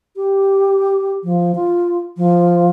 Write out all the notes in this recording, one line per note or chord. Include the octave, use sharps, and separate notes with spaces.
G4
F3
F4
F3